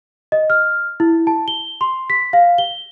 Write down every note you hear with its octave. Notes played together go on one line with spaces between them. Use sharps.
D#5
F6
E4
A5
G7
C6
B6
F5
G7